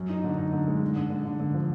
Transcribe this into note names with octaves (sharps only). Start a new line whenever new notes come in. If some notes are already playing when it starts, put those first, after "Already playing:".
Already playing: F#2
D#4
D3
D#4
D3
G#3
D3
D3
D3
D3
D3
F3